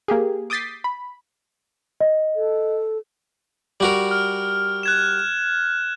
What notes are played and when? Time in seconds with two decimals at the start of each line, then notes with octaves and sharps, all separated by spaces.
0.08 A#3 G4 G#4
0.50 D6 D#6 G6 A6 B6 C7
0.84 B5
2.00 D#5
2.36 A4
3.80 G3 F#4 A#4
4.11 F6
4.83 F#6 G#6 E7